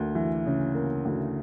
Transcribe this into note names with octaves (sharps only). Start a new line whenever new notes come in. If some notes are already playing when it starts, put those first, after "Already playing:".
Already playing: D2 A#3
E3
C#3
A#3
D2